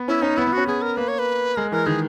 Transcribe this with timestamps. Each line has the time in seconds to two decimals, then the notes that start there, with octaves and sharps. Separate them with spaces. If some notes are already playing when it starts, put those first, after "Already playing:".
Already playing: B3
0.08 C#4 E4
0.22 C#4 D#4
0.37 B3 E4
0.47 B3
0.53 C#4 F#4
0.67 B3 G#4
0.82 A#4
0.97 A#3 B4
1.08 C#5
1.19 B4
1.56 G#3 A#4
1.71 E3 A#4
1.86 D#3 G#4